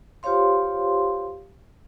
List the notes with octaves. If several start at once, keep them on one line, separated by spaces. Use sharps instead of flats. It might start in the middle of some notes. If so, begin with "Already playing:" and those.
F4 G4 C5 C#5 F5 C6